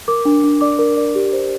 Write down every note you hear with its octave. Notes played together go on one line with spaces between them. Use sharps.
A#4 D6
D4
D4
D5 D6
A#4
D5
G4
C5